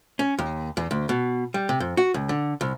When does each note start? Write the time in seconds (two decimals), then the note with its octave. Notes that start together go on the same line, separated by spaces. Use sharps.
0.19 C#4
0.39 D#2
0.77 E2
0.91 D2
1.09 B2
1.54 G3
1.69 C3
1.80 F2
1.97 F#4
2.14 C#2
2.29 D3
2.61 C2